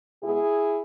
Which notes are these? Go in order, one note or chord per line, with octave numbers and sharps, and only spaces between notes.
B2 G#3 B3 E4 G#4